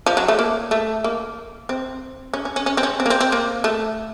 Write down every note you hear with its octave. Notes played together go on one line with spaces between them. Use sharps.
F3
F#3
A3
A#3
A3
A#3
C4
C#4
C#4
C#4
C#4
C4
C#4
C4
A#3
C4
C4
A#3
A3